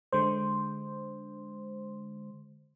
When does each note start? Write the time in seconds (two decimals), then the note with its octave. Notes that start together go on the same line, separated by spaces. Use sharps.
0.13 D3 G#3 C5